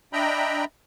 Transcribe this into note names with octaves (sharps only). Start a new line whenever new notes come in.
D4 D#5 E5 G5 A#5 B5